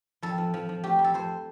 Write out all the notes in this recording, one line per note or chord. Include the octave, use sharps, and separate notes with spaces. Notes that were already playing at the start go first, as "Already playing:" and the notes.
F2 A4
F3
F3
F3
A3 G4
F2
A4
F2 C5